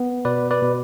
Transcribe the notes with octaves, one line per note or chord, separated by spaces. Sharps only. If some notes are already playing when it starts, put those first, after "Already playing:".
Already playing: B3
B2 B4 D5
B4 D5
B2